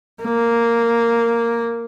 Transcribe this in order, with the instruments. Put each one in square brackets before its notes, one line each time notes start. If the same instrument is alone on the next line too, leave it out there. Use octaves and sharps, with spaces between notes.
[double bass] A#3